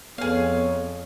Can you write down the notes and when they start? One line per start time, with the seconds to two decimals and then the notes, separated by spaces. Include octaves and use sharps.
0.18 F2 B3 G#4 A4 C#5 F5